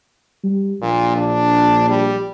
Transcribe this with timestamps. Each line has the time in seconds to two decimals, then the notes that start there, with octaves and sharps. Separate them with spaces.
0.44 G3
0.81 A#1 A#2
1.17 D4
1.89 G3